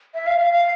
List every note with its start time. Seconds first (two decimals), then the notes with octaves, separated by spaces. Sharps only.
0.14 E5
0.26 F5
0.39 F5
0.51 F5